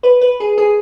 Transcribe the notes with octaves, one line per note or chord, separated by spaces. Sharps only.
B4
B4
G#4
G#4